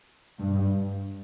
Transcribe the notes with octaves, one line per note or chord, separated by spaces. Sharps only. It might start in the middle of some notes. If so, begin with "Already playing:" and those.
G2